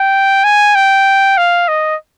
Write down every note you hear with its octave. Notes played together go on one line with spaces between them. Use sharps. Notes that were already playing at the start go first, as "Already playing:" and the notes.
Already playing: G5
G#5
G5
F5
D#5